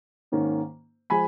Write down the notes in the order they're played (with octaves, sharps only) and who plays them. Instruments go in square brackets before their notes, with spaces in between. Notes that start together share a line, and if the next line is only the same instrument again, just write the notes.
[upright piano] G#2 D#3 A#3 C#4
F3 G#3 G#5 B5